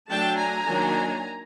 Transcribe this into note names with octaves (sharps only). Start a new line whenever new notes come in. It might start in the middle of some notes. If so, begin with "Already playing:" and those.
F#3 A3 D4 G5 A5
G#5 A#5
D#3 F#3 A#3 D4